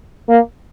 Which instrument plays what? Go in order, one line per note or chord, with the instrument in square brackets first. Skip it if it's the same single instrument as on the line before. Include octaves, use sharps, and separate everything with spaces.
[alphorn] A#3